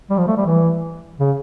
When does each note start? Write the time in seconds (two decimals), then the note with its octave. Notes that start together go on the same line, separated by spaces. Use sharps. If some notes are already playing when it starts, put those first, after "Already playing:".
0.10 G3
0.18 F3
0.27 A3
0.37 G3
0.46 E3
1.20 C#3